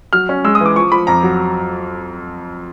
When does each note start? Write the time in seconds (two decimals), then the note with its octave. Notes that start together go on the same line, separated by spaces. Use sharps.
0.13 F#3 F6
0.29 C#4
0.44 G#3 E6
0.55 D#6
0.60 E3
0.66 D6
0.76 F3 C#6
0.92 F3 B5
1.07 F2 A#5
1.23 F#3